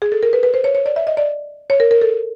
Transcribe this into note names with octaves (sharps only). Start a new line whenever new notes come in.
G#4
A4
A#4
B4
B4
C5
C#5
C#5
D5
E5
D#5
D5
C#5
A#4
A#4
A4